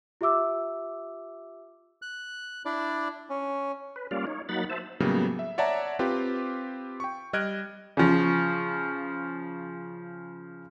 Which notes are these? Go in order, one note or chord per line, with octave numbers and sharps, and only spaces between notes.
F4 G4 E5 D6 E6
F#6
D4 E4 D5
C#4
B4
G3 A#3 C#4 F4 D5 F5
D#4 C#5
F#3 A#3 D#4 F#5 B5 A6
C5 E5 A5
A2 C#3 F#3 G3 A#3 B3
E5
C#5 D5 E5 F#5 A5 A#5
C4 F4 G4 B4
G5 C#6
G3 D#5 F6 F#6 G#6 D7
C#3 F3